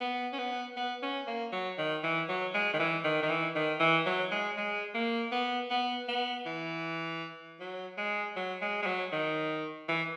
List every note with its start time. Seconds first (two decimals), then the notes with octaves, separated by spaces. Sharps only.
0.01 B3
0.33 C#4
0.38 B3
0.77 B3
1.02 C#4
1.27 A#3
1.52 F#3
1.78 D#3
2.03 E3
2.29 F#3
2.54 G#3
2.73 D#3
2.79 E3
3.04 D#3
3.23 D#3
3.30 E3
3.55 D#3
3.80 E3
4.06 F#3
4.31 G#3
4.57 G#3
4.94 A#3
5.32 B3
5.70 B3
6.08 B3
6.46 E3
7.60 F#3
7.98 G#3
8.36 F#3
8.61 G#3
8.82 G#3
8.86 F#3
9.12 D#3
9.88 E3